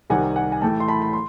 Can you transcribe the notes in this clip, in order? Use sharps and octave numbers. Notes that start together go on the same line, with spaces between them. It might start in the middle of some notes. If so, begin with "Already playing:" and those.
C2 C3 D#3 F#5 G#5
F#5 G#5
G#5
A2 E3 A3 G5 A5
C6
A5 B5
B5
C6